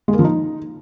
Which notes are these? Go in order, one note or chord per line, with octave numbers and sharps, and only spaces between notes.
G#3
A#3
F3
D#4